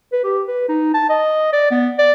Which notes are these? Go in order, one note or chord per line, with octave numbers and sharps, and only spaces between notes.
B4
G4
B4
D#4
A5
D#5
D5
B3
D5